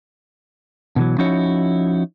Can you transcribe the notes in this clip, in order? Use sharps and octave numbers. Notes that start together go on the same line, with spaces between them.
B2 D3 E3 F#3
F3 C#4 D#4 E4 F#4 C#5